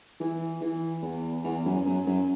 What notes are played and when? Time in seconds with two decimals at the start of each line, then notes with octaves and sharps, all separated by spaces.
0.20 E3
0.61 E3
1.02 E2
1.44 E2
1.65 F#2
1.86 F#2
2.07 F#2